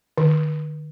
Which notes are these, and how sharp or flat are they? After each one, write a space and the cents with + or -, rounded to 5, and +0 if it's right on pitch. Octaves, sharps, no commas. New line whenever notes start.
D#3 -45